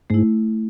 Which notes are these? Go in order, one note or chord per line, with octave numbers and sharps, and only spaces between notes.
G#2 A3 E4